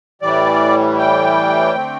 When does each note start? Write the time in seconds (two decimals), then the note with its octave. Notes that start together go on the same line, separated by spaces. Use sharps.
0.22 A2 E3 G3 D5
0.99 G5
1.75 D3 A3 C4